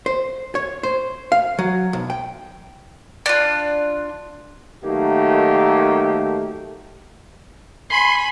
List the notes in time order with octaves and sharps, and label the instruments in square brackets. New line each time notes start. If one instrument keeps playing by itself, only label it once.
[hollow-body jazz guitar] C5
C#5
C5
F5
F#3
B1
G5
[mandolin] D4 F4
[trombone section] D#3 F#3 A3 A#3 G4 A4
[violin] G#5 B5 [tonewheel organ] C6